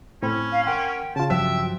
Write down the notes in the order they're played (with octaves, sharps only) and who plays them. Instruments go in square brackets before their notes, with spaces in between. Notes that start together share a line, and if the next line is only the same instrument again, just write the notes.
[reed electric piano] A2 C4 B5 [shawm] C#4
[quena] F5
[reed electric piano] A#4 F#5 C6 [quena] G5
[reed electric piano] C#3 F4 [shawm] A5
[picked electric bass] G2 F3 F#3 [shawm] E5 [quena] G5